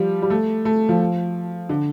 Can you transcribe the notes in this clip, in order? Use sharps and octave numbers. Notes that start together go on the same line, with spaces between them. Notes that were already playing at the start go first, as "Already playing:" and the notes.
Already playing: F3 G3
G3
A3
A3
F3
D3